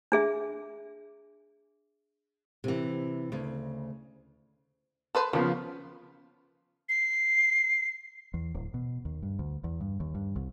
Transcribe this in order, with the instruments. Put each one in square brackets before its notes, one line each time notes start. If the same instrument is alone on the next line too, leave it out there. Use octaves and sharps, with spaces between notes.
[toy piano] D4 G#4 E5
[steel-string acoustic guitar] C3 E3
D2 C#3
[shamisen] A4 B4 C5
[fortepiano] C#3 F3 B3 [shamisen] A#3
[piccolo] C7
[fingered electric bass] E2
D1
B2
D#2
G2
D2
E2
G2
D#2
G2
C2